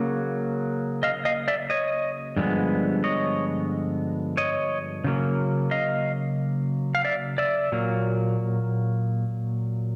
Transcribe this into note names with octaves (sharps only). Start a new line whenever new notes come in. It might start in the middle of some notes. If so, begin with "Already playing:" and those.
Already playing: C#3 F#3 A#3
D#5 F5
D#5 F5
D5 E5
C#5 D#5
G2 D3 F3 G#3 B3
C#5 D#5
C#5 D#5
C#3 F#3 A#3
D#5 F5
F5
D5 E5
D5 E5
A#2 F#3 A#3